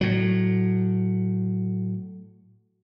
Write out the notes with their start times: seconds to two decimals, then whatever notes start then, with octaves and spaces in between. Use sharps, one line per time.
0.01 A2 F#3